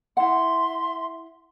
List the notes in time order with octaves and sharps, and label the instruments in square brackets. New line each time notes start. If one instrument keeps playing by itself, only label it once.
[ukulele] E4 F#5 [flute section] E5 C6